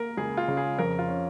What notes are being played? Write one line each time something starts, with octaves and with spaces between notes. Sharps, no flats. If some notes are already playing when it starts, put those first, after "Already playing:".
Already playing: A#3 A#4
C#2 G#4
F4
C#3
G#4
F2 A#4
F4
C#4